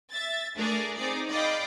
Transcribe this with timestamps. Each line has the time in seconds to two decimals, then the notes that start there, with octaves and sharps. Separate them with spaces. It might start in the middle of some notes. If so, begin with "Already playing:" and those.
0.11 E5 A6
0.57 A3 D4 G#4 A#4 D5
0.97 C4 D#4 G#4 D5
1.29 D5 D#5 F5 G5 B5 D6